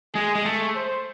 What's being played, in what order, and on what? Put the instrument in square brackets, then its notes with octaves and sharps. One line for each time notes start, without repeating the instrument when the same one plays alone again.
[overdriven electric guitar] G#3 [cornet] G#4
[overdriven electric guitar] G#3
[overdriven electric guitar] A3 [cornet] A4
[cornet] C5